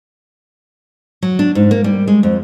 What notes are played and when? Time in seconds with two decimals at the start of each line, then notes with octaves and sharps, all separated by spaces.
1.22 F#3
1.39 D4
1.55 G#2
1.71 A#3
1.84 G3
2.07 G#3
2.23 F2